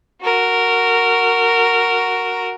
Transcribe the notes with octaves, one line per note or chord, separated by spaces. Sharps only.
F#4 A#4